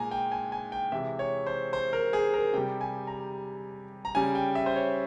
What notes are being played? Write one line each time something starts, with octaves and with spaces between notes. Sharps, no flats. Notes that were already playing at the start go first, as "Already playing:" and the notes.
Already playing: A#2 G#3 G#5 A#5
G5
G#5
G#5
G5
C3 E3 G#3 E5
C#5
C5
C5
A#4
G#4
A#4
C3 G3 G5
G#5
A#5
A#5
C#3 G3 G#5
G5
E5
C5
C#5